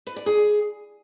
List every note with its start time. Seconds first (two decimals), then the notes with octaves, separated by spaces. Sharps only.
0.07 B4
0.16 D5
0.26 G#4